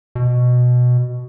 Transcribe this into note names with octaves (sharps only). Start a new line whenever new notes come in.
B2